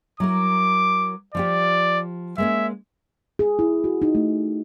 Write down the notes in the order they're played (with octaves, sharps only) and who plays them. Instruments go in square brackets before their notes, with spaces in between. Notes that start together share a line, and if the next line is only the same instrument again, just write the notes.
[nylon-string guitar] F#3 E4 A#4 [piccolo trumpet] D6
[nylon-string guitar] F3 F4 G4 [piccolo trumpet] D5
[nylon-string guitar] G#3 A#3 C#4 [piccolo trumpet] E5
[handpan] G#4
E4
F#4
D#4
A3